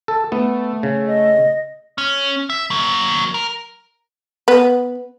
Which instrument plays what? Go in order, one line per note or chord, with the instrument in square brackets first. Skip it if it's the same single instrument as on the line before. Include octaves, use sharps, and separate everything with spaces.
[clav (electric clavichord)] A4
[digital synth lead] A3 [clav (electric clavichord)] B3
[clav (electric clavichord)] C#3
[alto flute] D#5
[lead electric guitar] C#4
E5
F#3 A#3
A#4
[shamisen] B3